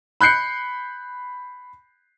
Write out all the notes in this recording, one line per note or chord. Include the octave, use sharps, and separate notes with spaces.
B5 F#6 G6 C7 C#7